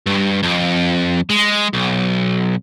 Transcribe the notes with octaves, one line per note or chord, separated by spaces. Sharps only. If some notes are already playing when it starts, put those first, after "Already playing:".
G2
F2
G#3
B1